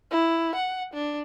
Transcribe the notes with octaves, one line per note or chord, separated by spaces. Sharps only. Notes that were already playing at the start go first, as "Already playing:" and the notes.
E4
F#5
D4